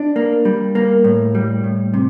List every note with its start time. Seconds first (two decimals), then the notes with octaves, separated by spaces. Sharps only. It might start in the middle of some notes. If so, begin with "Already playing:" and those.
Already playing: D4
0.16 A#3
0.45 G3
0.75 A#3
1.04 A2
1.35 G3
1.64 A2
1.94 C3